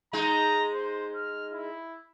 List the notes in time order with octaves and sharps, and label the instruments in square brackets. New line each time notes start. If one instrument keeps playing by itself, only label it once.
[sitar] G#3 D#4 [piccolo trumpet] A#5
[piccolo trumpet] C5
F6
E4